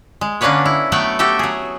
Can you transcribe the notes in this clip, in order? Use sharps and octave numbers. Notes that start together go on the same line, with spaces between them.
G#3
D3 A#3 C#4 D4 B4 C#5
E4
F#3 A3 B3 F#5 G5
F#4 G4 A4 E5 G5
F#3 G#4